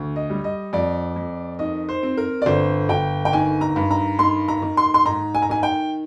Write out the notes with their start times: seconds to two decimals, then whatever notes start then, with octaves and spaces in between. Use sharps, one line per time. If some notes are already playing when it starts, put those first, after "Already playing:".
Already playing: D2
0.16 D#5
0.30 G3
0.44 D#5
0.73 F2 D5
1.16 F2
1.59 D#3 D#5
1.89 C5
2.03 C4
2.17 A#4
2.42 D5
2.46 G1 C5
2.89 G1 G5
3.25 G5
3.33 D#3 G#5
3.61 A#5
3.76 G2
3.91 A#5
4.19 D#3 C6
4.48 A#5
4.62 D#3
4.77 C6
4.94 C6
5.06 G#2 A#5
5.35 G#5
5.42 A#5
5.49 D#3 G#5
5.63 G5